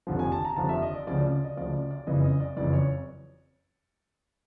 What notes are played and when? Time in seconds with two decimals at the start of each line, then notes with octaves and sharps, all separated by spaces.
0.07 F1 D#2 D3 F3
0.19 G#5
0.32 A5
0.45 A#5
0.56 F1 D#2 D3 F3 A5
0.69 E5
0.82 D#5
0.95 D5
1.07 D2 C#3 F3 D5
1.19 D5
1.31 D5
1.44 D#5
1.57 D2 C#3 F3 D5
1.73 D5
1.91 D5
2.07 F#1 F2 C#3 E3 D#5
2.24 D#5
2.40 D5
2.56 F#1 F2 C#3 E3 D5
2.73 C#5